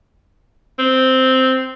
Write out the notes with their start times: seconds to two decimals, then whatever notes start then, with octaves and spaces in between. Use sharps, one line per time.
0.79 C4